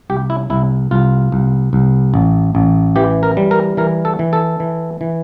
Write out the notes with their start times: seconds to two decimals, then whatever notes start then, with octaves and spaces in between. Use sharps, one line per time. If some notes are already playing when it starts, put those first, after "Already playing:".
0.10 C2 G4
0.30 E4
0.50 C2 E4
0.91 C2 F4
1.32 C2
1.73 C2
2.14 A1
2.55 A1
2.96 E3 G4
3.23 A#4
3.37 G3
3.51 A#4
3.77 E3 A#4
4.05 A4
4.19 E3
4.33 A4
4.60 E3
5.01 E3